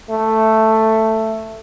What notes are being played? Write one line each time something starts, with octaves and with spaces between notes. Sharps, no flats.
A3